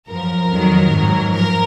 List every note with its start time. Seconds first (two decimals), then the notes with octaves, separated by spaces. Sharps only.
0.08 F#2 F3 A#4
0.50 F2 D#3 F#3
0.92 G#2 F#3
1.33 F3 A#4